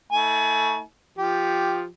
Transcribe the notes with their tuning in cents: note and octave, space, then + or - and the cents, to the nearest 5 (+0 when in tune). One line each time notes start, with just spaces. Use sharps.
A3 +15 D#4 +45 G#5 +35
F3 +0 G4 +0